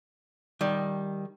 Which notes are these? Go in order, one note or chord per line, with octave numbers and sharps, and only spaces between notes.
D#3 G3